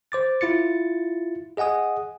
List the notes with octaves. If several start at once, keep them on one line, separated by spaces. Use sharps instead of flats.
C5 D6 A6
E4 F4 A6 C#7
G#4 D#5 F#5 G#5 D#6